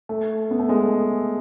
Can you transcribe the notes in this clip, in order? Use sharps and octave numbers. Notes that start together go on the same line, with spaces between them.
A3
B3
A3
G#3